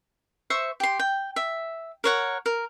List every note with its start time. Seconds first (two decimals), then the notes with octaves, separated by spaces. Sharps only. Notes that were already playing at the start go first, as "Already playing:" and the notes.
0.50 C5 E5 C#6
0.80 G4 C6
0.99 G5
1.36 E5
2.04 A#4 C#5 F#5
2.46 A#4